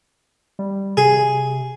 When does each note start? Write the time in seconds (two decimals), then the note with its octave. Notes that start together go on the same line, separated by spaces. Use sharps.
0.59 G3
0.97 C3 G#4